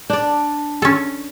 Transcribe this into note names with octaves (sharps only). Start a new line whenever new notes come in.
D4 D5
C#4 A4